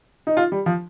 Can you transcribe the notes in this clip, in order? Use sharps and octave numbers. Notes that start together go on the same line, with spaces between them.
D#4
F4
G3
F3